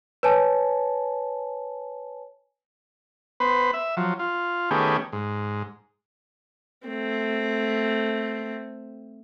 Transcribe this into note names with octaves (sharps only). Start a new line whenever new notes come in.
B4 C#5 G#5 A5
B3 B4 C5
E5
F3 F#3
F4
D#3 A3 B3 C#4 G4 G#4
G#2
A3 C4